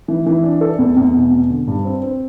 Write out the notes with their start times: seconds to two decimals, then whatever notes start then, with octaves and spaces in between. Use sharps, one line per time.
0.08 E3
0.26 E3
0.43 D4
0.61 A4
0.79 E2
0.97 E2
1.15 B2
1.32 B2
1.50 D3
1.67 G2
1.85 C4
2.02 C4